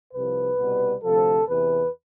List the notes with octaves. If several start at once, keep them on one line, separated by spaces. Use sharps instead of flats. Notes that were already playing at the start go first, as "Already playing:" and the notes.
C2 C3 F3 B4
C2 B2 G3
D2 C3 F3 A4
E2 C3 E3 B4